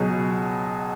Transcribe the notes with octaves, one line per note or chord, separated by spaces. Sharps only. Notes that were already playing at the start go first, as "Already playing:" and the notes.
Already playing: C#2 B2 F#3 G#4